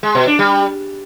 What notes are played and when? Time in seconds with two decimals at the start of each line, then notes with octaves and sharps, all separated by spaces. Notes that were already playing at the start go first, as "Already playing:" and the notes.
0.03 G#3
0.15 B2
0.27 D4
0.39 G3